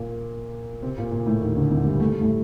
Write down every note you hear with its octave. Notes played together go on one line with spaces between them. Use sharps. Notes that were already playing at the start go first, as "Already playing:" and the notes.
Already playing: A#2 A#3
C3 C4
A#2 A#3
A#2 A#3
A2 A3
D#2 D#3
D2 D3
C2 C3
G2 G3
A3
G3
A2 A3